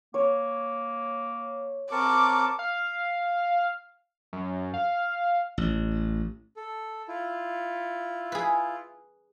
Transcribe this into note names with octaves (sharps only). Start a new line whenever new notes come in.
A#3 C#5
C4 A#4 A5 C#6 D6
F5
F#2
F5
A1
A4
E4 F4
G#4 B4